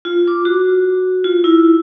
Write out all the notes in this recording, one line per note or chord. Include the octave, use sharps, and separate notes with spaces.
F4
D6
F#4
F4
E4